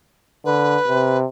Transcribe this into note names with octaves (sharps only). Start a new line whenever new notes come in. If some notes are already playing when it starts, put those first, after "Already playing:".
D3 B4
C3